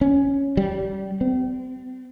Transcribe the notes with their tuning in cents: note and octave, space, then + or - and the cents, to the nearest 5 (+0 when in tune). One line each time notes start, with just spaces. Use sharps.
C#4 +0
G3 -25
C4 -40